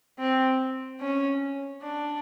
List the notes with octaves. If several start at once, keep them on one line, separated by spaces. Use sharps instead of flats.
C4
C#4
D4